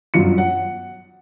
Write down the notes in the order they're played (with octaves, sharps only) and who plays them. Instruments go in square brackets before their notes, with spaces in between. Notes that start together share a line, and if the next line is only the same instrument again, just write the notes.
[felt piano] G1 F#2 F#3 F4 C#7
F#5